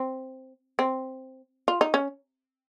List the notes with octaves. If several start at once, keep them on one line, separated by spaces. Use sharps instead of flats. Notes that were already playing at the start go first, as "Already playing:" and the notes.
Already playing: C4
C4
F4
D#4
C#4